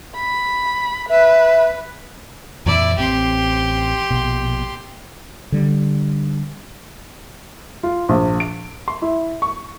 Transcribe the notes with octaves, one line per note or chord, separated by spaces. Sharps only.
B5
B4 E5
F2 A#2 E3 E4 D5
A1 C4 G4 C6
A#1 B2
D3 G3
F4
A#1
D7
C6
E4
C#6